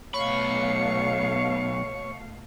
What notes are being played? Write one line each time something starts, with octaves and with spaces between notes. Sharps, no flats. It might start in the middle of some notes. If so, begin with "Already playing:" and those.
B1 B2 A3 C#5 F5 B5 C#6